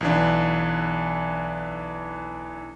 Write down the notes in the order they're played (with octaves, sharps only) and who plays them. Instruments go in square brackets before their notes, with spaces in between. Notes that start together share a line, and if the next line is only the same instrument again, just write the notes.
[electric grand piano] B1 E3 D4